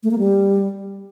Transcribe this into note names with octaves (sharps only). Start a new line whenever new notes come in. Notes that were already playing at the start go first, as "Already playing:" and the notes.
A3
A#3
G3